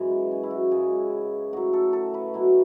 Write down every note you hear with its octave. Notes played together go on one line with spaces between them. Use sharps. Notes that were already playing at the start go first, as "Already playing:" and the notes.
Already playing: F#2 E3 G#3
B3
C#4
E4
F#4
F#2 C#3 G#3 G#4
A2 F#3 F#4
A4
A4
B4
B2 F#3 E4